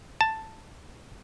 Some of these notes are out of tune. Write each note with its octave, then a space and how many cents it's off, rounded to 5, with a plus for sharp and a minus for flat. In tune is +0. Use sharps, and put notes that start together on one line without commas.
A5 +5